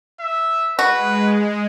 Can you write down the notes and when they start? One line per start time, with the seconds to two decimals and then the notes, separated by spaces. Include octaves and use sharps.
0.20 E5
0.79 G#3 F#4 B4